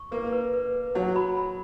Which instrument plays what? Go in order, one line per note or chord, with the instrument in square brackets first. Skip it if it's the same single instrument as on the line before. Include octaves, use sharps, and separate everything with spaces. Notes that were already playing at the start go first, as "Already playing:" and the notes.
Already playing: [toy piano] C#6
[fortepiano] A#3 [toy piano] B4
[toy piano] B4
B4
B4
[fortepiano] F#3 [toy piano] F#5
[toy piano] B5
B5